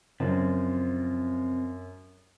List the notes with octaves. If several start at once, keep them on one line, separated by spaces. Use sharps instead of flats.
F#2 C#3 F3 C4